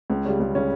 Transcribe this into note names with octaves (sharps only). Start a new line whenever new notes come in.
C#2
C#3 G3 C#4
C#2
C#3 G3 C#4